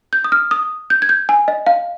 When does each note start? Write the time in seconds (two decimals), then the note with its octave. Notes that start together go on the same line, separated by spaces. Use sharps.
0.13 G6
0.24 D#6
0.32 F6
0.51 D#6
0.90 G6
1.02 G#6
1.09 G6
1.29 G#5
1.48 D#5
1.66 F5